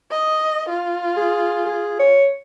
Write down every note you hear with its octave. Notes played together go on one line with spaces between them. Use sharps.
D#5
F4
G#4
G#4
C#5